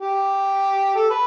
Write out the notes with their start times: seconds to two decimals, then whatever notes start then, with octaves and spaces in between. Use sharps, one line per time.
0.01 G4
0.96 A4
1.11 B4